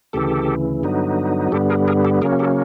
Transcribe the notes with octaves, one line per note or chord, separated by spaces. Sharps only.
D2 C#3 E3 G4 A4
G2 D3 F#3 B3 D#4
G2 D3 G3 B3 G4 A4
G#4 A#4
G#4 A#4
G4 A4
C#3 F#3 A#3 C#4 G#4 A#4
G4 A4